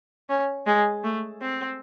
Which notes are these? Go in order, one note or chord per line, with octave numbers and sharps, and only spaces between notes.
C#4
G#3
A3
C4